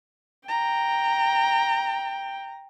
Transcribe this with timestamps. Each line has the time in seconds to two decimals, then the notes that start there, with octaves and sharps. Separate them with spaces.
0.48 G5 A#5